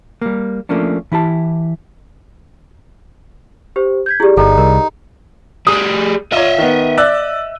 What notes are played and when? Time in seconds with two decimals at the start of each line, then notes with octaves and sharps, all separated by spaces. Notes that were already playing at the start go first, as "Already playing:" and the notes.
0.22 G3 A#3
0.69 F3 A3 A#3 C#4 D4
1.12 E3 E4 G4 A5
3.76 G4 C5
4.06 G6 G#6 B6
4.20 E4 G4 G#4 D5
4.37 G1 D#4 A4
4.58 C2 A#4
5.67 G3 G#4 D#6
6.32 F4 C#5 D#5 E5
6.58 D#3 B3
6.98 D5 E6 F#6